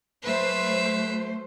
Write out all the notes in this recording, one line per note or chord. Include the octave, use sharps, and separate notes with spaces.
F#3 A3 B4 C5 E5